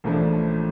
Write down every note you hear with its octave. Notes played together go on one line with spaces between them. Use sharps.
A1 A2 F3 A3 D4